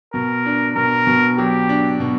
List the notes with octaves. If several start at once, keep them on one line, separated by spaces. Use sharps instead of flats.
B2 A#4
D4
B2 A#4
B2
F#3 G4
D4
B2